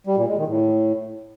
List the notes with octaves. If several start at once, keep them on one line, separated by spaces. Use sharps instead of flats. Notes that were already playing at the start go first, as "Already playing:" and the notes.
G3
A#2
G#3
D#3
A2